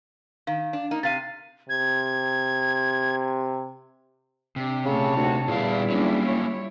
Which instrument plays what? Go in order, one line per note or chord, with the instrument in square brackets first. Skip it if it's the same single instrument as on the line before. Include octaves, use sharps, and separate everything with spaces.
[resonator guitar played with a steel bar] D#3 [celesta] F5
[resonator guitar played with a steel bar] D4
A#3 D#4
[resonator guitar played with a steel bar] C3 F5 [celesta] A6 D#7
[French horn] C3 [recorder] G#6
[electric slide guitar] C3 [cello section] D4 G4
[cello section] A#2 A3 [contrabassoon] C#3 [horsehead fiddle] C#5 A5
[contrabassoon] D2 [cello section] D#4 F#4
[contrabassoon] E2 [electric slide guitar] A#2 D3 F5 [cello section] G3 E4 F4
[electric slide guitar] F#3 A#3 [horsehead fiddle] C#4 D4
[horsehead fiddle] C#5